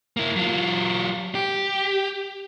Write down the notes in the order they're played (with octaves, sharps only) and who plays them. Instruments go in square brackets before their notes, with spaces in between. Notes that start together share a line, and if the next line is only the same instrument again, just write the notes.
[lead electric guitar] A#3 E4
F#3 F4
G4